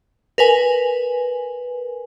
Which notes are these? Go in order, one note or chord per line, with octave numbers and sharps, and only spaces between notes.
A#4 B4 G#5